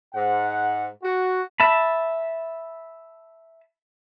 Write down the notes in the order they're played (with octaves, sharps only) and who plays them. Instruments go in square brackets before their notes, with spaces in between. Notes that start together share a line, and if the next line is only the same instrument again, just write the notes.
[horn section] G#2 F#5
F#4
[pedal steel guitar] E5 A5 B5